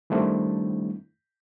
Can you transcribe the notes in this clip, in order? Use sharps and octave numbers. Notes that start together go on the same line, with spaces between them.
D#3 G3 A3 C4 D4 E4